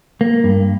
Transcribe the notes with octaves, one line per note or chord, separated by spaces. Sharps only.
A#3
G2